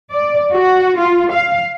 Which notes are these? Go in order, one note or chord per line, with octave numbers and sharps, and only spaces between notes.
D5
F#4
F4
F5